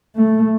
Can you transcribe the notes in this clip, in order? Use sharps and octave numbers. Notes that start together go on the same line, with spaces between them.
A3